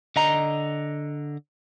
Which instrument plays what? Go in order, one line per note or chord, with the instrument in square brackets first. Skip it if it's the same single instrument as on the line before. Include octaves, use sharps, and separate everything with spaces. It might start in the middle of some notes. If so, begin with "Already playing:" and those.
[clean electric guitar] D3 D#5 A#5